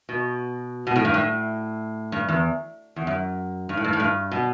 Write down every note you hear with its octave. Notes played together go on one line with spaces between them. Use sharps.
B2
B2
A2
G2
A2
G2
E2
E2
F#2
G2
A2
G2
A2
G2
B2